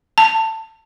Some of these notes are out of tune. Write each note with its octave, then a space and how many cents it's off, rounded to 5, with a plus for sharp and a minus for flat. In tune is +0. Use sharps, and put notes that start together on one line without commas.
A5 +20